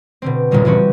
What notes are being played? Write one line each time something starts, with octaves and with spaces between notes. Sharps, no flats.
B2 D3 C4
G1 D#2 A#2 C#3 G3
E3 C4 C#4 F#4